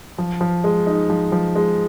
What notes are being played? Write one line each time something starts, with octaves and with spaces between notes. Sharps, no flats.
F3
F3
G#3
D#4
F3
F3
G#3